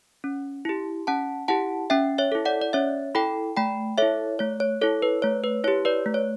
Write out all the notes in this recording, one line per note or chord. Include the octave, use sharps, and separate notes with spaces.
C#4
E4 G4
C#4 F#5 A5
E4 G4 F#5 A5
C#4 E5 G5
C#5 E5
E4 A4
D5 F#5
D5
C#4 C#5 E5
E4 A4 G5 B5
A3 G5 B5
E4 A4 C#5 E5
A3 C#5
C#5
E4 A4 C#5
B4
A3 C#5
B4
E4 G4 C#5
B4 D5
A3
C#5